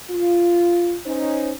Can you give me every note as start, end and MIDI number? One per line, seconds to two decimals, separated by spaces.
0.11 0.97 65
1.06 1.52 61
1.06 1.52 63
1.06 1.52 72